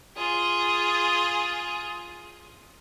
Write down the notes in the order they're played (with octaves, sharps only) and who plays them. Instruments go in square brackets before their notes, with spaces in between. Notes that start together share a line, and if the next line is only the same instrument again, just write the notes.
[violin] F4 G#4